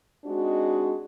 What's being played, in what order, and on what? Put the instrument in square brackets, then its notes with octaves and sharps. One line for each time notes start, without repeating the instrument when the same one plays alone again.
[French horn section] G#3 C4 D4 D#4 F#4